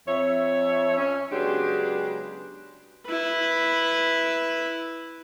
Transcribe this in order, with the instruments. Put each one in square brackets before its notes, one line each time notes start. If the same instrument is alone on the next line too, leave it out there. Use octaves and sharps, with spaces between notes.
[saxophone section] F2 C#5 E5
C#4
C#3 F#3 G#3 B3 D4 G4
[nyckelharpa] E4 B4